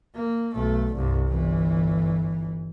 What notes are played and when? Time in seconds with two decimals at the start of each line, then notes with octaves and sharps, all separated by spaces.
0.15 A#3
0.54 B1 A3
0.95 C2 G2
1.28 G1 E3